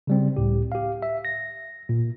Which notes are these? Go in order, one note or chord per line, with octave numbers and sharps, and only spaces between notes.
C#3 G3 C4
C#2 A2 G4
G4 F5
E5
A#6
A#2